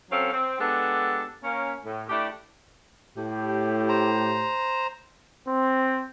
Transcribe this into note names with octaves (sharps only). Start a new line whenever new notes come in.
F#3 C4 C#4 A4 F5
C4
G#3 B3 D4 G4 A4
A#3 C#4
A2
A3 D4 E4 G4
A2 G4
C5 A#5
C4